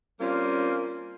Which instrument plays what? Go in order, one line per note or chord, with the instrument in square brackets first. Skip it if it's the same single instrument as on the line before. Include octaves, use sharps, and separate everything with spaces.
[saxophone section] G3 A#3 C4 C#4 F4